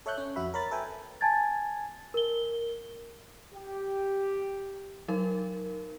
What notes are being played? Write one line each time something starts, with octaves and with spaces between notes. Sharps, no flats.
A4 C#5 E5 C#6 F#6 G6
C#4 C#5
F2 F#4 E5 B5
A#4 C#5 B5 A6
A4 B4 E5 G5 G#5
G#5 A5 G#6 A6
A#4 G7
G4
F#3 D#4 A#4